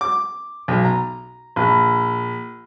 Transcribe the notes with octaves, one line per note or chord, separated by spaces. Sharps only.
D6
B1
A#5
A#1